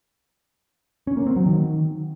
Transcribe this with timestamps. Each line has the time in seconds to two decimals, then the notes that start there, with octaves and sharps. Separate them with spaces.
1.07 C#4
1.17 A#3
1.27 C4
1.36 F#3
1.46 D#3